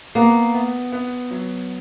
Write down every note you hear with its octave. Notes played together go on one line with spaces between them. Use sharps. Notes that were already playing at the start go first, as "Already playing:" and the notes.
A#3 B3
B3
B3
F#3